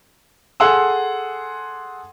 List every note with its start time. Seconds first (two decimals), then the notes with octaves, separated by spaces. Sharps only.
0.60 G#4 A4 F#5 C6 E6